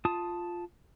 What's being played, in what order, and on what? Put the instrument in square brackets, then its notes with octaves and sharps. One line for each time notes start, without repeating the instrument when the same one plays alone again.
[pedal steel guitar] F4 A5 D#6